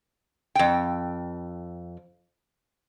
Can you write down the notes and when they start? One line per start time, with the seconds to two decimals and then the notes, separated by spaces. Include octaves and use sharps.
0.55 F2 G5